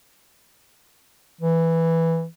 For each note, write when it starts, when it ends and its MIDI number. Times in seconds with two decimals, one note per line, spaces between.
1.41 2.25 52